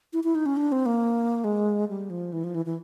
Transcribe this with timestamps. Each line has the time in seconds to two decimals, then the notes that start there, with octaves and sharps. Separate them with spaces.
0.13 E4
0.24 E4
0.35 D#4
0.46 C#4
0.57 D4
0.72 C4
0.86 A#3
1.44 G#3
1.88 G3
2.10 F3
2.33 E3
2.44 F3
2.55 E3
2.66 E3